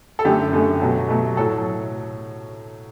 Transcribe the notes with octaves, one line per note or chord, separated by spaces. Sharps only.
A4
F#2 D3 A3 G4
F#2 D3 A3
B2 F#3 A3
B2 F#3 A3
A2 F#3 A4